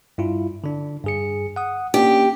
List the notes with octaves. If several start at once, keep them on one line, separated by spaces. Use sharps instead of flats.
G2 E4 F4
D3 D4
G2 G#4 C#7
F#5 D#6
A#3 C#4 D4 G4